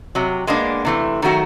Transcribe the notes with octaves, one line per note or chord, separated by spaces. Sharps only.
C3 F#3
G#3 A#3 B3 D4
C3 E3 A3
D#3 F#3 A3 F#4